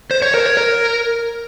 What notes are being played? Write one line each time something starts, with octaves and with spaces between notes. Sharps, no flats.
C5
C#5
A#4
C#5
A#4